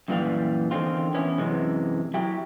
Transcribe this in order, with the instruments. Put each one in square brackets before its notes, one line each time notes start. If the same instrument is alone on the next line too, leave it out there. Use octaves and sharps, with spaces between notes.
[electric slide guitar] F#2 A#2 E3 G3 F4 F5
E2 D3 D#3 C4 F4
E3 B3 C#4 E4
F#2 C3 E3 G#3
F#3 E4 G4